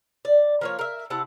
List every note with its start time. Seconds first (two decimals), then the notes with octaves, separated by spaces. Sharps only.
0.25 D5
0.61 F3 A#3 C#5
0.79 A#4 E5
1.10 C3 E4 F#5 A5